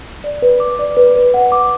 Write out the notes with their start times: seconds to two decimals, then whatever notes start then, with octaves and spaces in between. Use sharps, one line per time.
0.24 D5
0.42 B4
0.60 D6
0.79 D5
0.97 B4
1.16 B4
1.34 F#5
1.52 D6